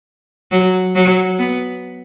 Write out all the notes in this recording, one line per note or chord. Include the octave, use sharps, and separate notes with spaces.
F#3
F#3
B3